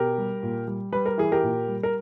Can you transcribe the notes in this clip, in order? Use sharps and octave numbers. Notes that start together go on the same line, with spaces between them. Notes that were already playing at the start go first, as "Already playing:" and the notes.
Already playing: B2 G4 A#4
G3
A#2
G3
G3 B4
A#4
E3 G#4
G4 A#4
A#2
G3
A#4